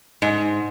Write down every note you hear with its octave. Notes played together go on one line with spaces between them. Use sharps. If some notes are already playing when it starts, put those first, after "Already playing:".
G#2